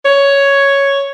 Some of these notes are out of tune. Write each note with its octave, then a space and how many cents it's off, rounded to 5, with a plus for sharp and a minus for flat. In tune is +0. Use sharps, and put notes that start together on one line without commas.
C#5 +5